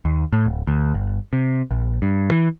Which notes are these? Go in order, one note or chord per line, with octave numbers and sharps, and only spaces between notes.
D#2
A2
D1
D2
G1
C3
A#1
G2
E3